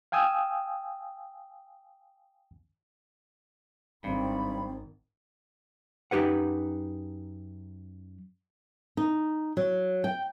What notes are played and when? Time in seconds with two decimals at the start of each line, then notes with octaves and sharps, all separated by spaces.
0.12 F5 G5 G#5 D#6 E6
4.04 G#1 G2 C4 B5
6.11 F#2 D#4 G4 B4 F#5
8.97 D#4
9.57 F#3
10.04 G5